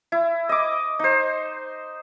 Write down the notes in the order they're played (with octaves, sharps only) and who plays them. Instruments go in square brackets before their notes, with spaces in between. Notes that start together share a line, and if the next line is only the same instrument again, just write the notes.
[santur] E4
D#5 D6
D#4 C5